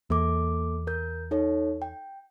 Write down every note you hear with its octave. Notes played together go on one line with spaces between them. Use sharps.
E2 A#3 A4 D6
A#4 G6
D#4 A4 C#5
G5